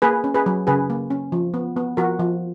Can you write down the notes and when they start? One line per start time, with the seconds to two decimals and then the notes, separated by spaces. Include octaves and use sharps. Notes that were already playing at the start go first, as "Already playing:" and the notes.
0.02 A#3 G#4 B4
0.24 C#4
0.34 G#4 B4
0.46 F#3
0.67 C#3 G#4 B4
0.90 A#3
1.10 C#4
1.32 F3
1.54 B3
1.77 B3
1.97 F3 F#4 A#4
2.19 F3